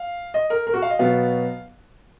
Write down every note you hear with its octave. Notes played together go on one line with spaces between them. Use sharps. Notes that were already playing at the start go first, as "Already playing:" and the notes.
Already playing: F5
D#5
A#4
A#4
F#4
F5
D#5
B2 F#3 B3 F5